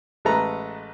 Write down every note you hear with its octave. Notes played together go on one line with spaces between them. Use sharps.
A1 G#3 A3 A4 B4 A#5